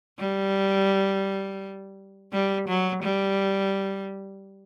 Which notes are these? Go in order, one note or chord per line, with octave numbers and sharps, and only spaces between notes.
G3
G3
F#3
G3